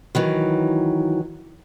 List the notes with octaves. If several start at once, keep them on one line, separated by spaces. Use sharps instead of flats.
D#3 E3 F#3